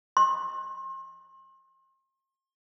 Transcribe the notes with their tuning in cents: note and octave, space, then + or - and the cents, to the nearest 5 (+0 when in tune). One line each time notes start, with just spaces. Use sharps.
C6 +40